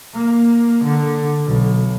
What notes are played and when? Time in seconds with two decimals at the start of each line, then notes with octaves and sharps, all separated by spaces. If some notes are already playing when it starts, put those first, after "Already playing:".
0.13 A#3
0.84 D3
1.46 B1